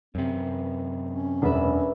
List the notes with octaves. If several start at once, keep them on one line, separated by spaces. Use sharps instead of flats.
F#2 C3 C4
E3
C#4
E1 D4 B4 E5